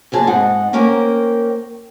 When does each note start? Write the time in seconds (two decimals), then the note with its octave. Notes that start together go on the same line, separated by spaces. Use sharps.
0.12 F#2 A#2 G#4 A5
0.27 G#2 C4 D#4 F#5
0.73 A#3 C#4 A#4 C5 G5